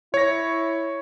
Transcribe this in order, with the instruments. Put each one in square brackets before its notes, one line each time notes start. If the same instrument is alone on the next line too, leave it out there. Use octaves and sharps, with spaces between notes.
[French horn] E4 [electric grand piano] C#5 A#6